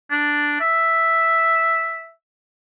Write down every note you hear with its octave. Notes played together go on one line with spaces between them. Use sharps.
D4
E5